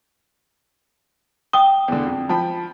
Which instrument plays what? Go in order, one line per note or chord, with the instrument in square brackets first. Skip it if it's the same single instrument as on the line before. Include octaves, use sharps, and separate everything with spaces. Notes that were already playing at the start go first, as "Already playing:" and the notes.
[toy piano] G5 D#6 [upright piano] G7
[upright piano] E2 D3
F2
[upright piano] F3 G5 B5 [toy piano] A5